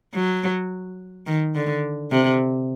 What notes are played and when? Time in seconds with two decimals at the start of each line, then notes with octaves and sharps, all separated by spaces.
0.14 F#3
1.27 D#3
1.55 D3
2.11 C3